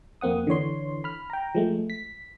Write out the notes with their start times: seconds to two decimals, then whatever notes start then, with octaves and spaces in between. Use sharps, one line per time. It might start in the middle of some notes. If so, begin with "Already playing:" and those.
0.21 F2 A#3 C4 F#5 D#6
0.47 D3 E3 C#5 C6
1.04 B5 F6
1.30 G5 A#5
1.55 F3 G#3 A3
1.90 B6